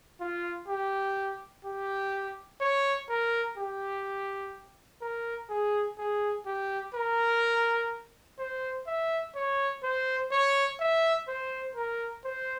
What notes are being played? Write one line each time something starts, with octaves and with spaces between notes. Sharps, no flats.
F4
G4
G4
C#5
A#4
G4
A#4
G#4
G#4
G4
A#4
C5
E5
C#5
C5
C#5
E5
C5
A#4
C5